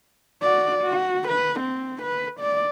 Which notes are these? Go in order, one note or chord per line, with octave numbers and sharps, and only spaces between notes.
F#4 D5
F#4
B4
C4
B4
D5